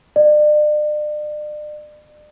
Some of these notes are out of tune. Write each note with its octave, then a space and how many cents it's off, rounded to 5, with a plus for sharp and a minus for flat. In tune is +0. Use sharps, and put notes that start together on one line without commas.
D5 +40